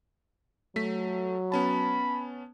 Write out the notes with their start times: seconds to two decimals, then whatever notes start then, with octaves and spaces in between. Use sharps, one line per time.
0.76 F#3 A3 B6
1.52 B3 C#4 A5 B5